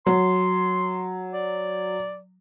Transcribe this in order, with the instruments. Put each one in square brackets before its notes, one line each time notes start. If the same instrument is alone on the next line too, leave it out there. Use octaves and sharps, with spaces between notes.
[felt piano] F#3 [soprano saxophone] C6
[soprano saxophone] D5